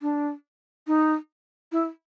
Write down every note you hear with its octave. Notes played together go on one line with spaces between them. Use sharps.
D4
D#4
E4